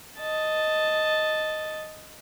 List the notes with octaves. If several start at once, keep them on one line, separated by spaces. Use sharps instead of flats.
D#5 A5